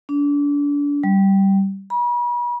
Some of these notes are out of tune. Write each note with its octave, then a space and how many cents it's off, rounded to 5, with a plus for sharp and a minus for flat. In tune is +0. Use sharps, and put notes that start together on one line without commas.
D4 -30
G3 -10
B5 -40